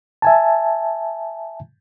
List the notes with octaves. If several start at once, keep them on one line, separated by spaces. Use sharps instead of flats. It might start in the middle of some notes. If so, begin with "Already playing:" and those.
E5 G#5 A5